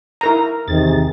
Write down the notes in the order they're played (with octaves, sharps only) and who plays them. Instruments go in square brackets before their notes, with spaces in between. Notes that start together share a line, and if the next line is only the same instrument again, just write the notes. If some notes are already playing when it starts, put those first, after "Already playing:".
[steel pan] E4 A#4 A#5
[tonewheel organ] E2 G#4 A6 [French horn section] C3 D#3